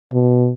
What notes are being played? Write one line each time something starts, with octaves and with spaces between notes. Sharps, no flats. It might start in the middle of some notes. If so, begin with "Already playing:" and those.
B2